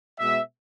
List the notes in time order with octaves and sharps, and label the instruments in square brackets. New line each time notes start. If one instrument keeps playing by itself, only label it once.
[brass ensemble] B2 G#3 B3 E5